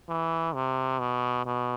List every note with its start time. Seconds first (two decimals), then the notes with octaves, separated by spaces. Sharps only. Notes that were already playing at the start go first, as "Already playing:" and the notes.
0.09 E3
0.54 C3
0.99 B2
1.46 B2